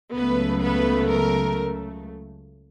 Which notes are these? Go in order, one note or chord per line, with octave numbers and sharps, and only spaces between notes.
C#2 C#3 F#3 A3 B3 B4
B3 B4
A#4